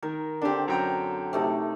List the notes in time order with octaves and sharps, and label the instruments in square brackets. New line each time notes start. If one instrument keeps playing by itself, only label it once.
[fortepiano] D#3 [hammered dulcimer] A#4
[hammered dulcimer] D3 C4 [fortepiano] D4 G4
[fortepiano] F#2 G5 A#5
[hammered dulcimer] C3 A3 D#4